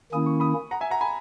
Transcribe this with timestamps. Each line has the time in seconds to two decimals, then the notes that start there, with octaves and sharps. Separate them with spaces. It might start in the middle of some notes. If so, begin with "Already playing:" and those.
0.12 D#3 A#3 C#4 E4 D#6
0.26 C#6
0.40 B5 D#6
0.71 F#5 A#5
0.81 E5 G#5
0.91 F#5 A#5
1.01 G#5 B5